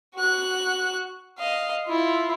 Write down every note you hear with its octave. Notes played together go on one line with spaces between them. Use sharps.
F#4 F#6
D#5 F5
E4 F4